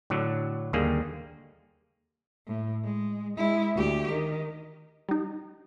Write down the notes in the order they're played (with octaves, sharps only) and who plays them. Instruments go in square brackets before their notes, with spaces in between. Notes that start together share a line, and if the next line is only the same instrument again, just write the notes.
[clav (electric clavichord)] A2 D3 F#3
D#2 D3 G3 A#3 G#4
[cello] A2
G#3
G#3 E4
D2 G4
D#3
[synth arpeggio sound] G3 D#4